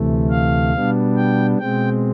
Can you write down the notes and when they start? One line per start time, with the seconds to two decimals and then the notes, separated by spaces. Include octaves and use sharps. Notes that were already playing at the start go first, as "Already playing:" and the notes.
Already playing: D2 C3 E3 A3
0.30 F5
0.73 B2 G3 B3 D4
1.16 G5
1.59 B2 G#3 C4 G5